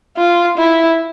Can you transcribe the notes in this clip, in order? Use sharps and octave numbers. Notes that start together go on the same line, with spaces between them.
F4
E4